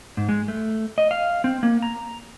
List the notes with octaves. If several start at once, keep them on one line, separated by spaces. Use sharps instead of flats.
G#2
G#3
A3
D#5
F5
C4
A#3
A#5